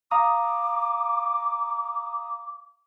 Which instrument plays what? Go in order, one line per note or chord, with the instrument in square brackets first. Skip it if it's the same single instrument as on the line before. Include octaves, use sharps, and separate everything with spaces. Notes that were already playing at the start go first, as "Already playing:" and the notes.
[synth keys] F5 A#5 D#6 [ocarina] D6